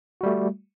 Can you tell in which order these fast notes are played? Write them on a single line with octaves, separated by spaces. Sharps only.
F#4 G3 A3